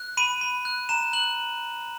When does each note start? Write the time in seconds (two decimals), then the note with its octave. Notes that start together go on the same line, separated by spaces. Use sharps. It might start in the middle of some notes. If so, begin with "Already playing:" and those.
Already playing: F#6
0.17 B5 D#7
0.41 B5
0.65 F#6
0.89 A#5 E7
1.13 F#6 F#7